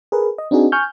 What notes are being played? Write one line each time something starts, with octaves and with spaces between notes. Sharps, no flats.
G#4 A#4 B4
D#5
C4 D4 D#4 F#4 G#4
G#5 C#6 F6 G6